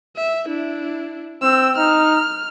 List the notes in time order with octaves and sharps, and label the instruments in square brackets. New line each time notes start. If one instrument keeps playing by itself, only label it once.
[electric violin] E5
D4 E4
[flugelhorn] C4 [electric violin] E6
[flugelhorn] D#4 [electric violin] F6